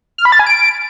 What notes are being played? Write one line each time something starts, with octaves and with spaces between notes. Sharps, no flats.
F6
B5
A6
G#5
D7